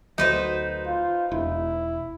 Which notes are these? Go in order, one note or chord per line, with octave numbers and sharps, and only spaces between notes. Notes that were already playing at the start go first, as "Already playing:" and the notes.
D2 F#3 D#4 B4 C5
F4
E1 E4